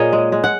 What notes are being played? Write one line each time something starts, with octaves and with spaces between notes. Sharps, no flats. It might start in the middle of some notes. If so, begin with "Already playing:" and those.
Already playing: A#2 G#4 A#4 C#5 D#5
G#3
G#3
F#5